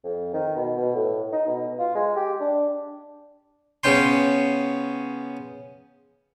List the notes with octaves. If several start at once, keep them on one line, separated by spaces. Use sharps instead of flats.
F2
D#3
B2
B2
A2
D#4
B2
F4
G#3
G4
D4
C#3 B3 C#4 G5 C6